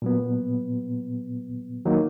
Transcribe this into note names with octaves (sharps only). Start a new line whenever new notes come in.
A#2 F#3 B3
D#3 F#3 A#3 D#4